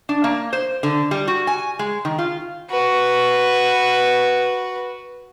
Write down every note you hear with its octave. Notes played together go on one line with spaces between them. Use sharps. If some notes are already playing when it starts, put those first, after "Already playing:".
D4
A#3
C5
D3
G3
F#4
G#5
G#3
D#3
F4
F#4 B4